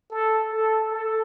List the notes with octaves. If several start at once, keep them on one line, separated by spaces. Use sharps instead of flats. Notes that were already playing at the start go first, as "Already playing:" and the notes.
A4
A4
A4